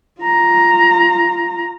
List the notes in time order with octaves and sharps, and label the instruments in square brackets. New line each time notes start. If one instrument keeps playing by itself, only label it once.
[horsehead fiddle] F4 A#5